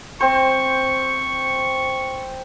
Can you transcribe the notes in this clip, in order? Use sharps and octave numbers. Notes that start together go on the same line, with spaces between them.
C4 C5 C#6